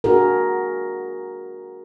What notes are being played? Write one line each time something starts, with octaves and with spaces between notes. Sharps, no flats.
D4 F#4 G#4 A#4